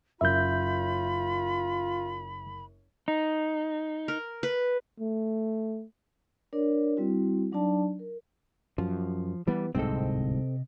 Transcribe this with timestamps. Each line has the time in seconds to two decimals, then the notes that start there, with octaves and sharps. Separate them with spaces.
0.21 F#1 F#2 F4 E5 B5 G6
3.08 D#4
4.08 A#4
4.43 B4
5.00 A3
6.53 D4 A#4 C#5 D5
6.97 G3 C4 E4 F#4
7.52 F#3 D4 D#4 D5 A5
7.99 A#4
8.78 F#2 F3
9.47 E3 G3 B3
9.75 D1 C2 G#2 C3 C4 A4 D#5